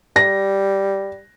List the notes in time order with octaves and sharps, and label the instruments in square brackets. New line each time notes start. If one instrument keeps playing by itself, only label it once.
[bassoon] G3 [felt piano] A#6